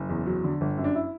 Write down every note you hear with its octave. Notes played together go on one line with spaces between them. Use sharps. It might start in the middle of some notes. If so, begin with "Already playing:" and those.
Already playing: F#1
E2
F#3
D3
G1
F#2
D4
E4